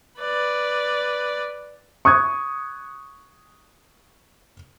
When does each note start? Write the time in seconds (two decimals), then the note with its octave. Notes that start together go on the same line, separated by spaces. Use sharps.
0.20 B4 D5
2.05 C#6 D#6 F#6 G#6